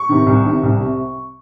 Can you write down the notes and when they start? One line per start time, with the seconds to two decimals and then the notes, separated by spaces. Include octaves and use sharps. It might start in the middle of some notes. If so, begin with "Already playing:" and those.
Already playing: C#6
0.09 C3 D#3
0.26 C2
0.45 C3 D#3
0.63 C2
0.80 C3